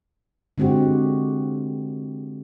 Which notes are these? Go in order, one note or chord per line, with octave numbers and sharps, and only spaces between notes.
D3 G#3 C4 F#4 G4